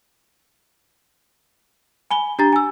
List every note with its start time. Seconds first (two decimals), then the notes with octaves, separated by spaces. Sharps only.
2.11 G#5 B5 G7
2.39 D4 G4 A#5 A6
2.53 G#5 E6